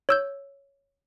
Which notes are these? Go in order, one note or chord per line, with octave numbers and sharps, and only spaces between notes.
C#5 E6 G6